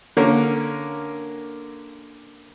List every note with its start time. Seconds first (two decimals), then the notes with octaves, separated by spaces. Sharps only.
0.17 D3 A#3 C#4 A#4